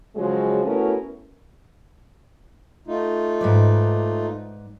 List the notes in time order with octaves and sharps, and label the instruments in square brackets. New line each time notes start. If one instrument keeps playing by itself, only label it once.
[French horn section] C#3 F3 F#3 G#3
A3 B3 C#4 E4 F#4 A#4
[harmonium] A3 D#4 F4
[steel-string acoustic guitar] G#2 B4 D5